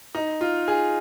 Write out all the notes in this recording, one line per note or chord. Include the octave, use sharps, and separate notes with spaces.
D#4
F4
G#4